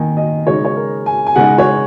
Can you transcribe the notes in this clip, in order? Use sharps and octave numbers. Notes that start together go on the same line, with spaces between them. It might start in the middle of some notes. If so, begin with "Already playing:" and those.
Already playing: D#3 A#3 D#4 G#5
D#5
C#3 G#3 D#4 C#5
C#5
A#4
G#5
G#5
C#3 G#3 D#4 F#5
C#5